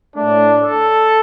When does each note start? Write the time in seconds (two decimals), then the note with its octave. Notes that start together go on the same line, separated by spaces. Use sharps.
0.16 A2 A3 D4
0.63 A4